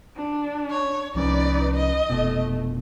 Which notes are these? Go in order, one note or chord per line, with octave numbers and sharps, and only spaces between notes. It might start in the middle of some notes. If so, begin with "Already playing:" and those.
D4
C#5
C2 F3 C#4 D#4 B4 D5
D#5
F1 B2 A3